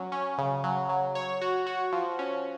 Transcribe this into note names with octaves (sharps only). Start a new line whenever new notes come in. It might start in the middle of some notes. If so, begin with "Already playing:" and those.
Already playing: F#3 C#4
C#4
C#3
F#3
F#3
C#5
F#4
F#4
F3
C#4